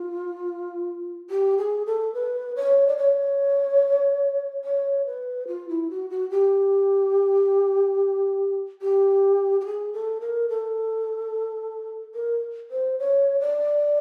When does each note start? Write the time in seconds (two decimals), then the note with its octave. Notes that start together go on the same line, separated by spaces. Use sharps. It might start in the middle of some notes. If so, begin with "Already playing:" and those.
Already playing: F4
1.30 G4
1.58 G#4
1.86 A4
2.14 B4
2.56 C#5
2.87 D5
2.97 C#5
4.64 C#5
5.06 B4
5.47 F4
5.69 E4
5.90 F#4
6.10 F#4
6.30 G4
8.81 G4
9.61 G4
9.65 G#4
9.93 A4
10.20 A#4
10.49 A4
12.15 A#4
12.70 C5
12.99 C#5
13.40 D5